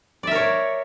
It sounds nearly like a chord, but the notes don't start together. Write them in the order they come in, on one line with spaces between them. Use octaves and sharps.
D5 E5 A#4 C#5